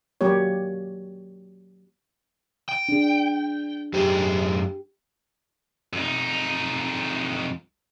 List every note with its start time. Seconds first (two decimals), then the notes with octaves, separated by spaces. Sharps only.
0.21 F#3 A#3 G4 C#5
2.69 G5
2.89 D4 G#4
3.93 F#2 G4 G#4 C5
5.93 F2 D#4